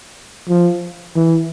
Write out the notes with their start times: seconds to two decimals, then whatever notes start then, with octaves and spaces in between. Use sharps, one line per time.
0.50 F3
1.17 E3